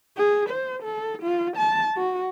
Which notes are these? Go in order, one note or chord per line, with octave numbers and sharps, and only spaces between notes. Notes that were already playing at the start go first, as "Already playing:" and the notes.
G#4
C5
A4
F4
A5
F#4